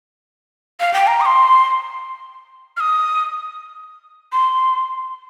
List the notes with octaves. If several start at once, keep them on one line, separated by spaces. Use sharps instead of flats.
F5
G5
A#5
D#6
C6
F6
D#6
C6